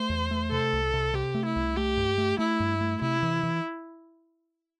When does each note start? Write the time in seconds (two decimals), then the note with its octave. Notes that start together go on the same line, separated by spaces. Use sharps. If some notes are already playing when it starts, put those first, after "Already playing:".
Already playing: A3 C5
0.10 E2
0.31 A3
0.51 C3 A4
0.73 C2
0.94 C3
1.14 C3 G4
1.34 A3
1.45 E4
1.56 C2
1.77 A3 G4
1.97 G2
2.18 A3
2.39 A3 E4
2.60 G2
2.81 A3
3.02 C3 E4
3.23 E3
3.43 E3